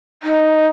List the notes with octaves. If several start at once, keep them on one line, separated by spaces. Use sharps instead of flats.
D#4